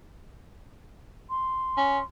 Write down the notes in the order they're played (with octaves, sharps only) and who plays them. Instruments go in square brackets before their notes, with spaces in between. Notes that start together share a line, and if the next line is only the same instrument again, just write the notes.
[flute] C6
[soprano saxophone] C#4